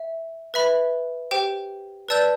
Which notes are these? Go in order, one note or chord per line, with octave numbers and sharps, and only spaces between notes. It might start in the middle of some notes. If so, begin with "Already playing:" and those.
Already playing: E5
B4 E5 B5
G4 C5 G5
B4 D5 A5 E6 G6